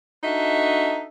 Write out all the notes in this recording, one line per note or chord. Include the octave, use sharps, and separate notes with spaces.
D4 D#4 F#4 A4 D#5 E5